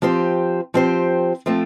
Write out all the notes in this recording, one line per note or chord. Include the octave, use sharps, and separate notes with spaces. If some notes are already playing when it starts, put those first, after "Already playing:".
F3 C4 G4 C5
F3 C4 G4 C5
F3 A3 C4